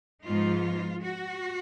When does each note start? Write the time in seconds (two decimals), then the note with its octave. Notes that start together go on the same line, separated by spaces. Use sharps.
0.24 G#2 F3 G#3 B3 D#4 F4
1.03 F#4